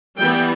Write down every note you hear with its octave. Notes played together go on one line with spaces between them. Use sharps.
E3 G3 B3 G5